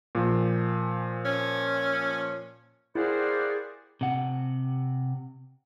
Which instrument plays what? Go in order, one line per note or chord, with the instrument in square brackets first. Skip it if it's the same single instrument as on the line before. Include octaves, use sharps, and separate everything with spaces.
[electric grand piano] A#2 F3
[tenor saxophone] C#4
[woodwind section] A#3 A#4 C5 [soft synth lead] E4 [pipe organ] G4 D5 F#5 [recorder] G#4
[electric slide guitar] C3 F#5